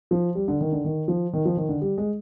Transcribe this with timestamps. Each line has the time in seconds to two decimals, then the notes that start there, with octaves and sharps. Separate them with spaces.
0.11 F3
0.35 G3
0.48 D3
0.61 D#3
0.72 D3
0.84 D#3
1.08 F3
1.33 D#3
1.45 F3
1.57 D#3
1.69 D3
1.81 G3
1.98 G#3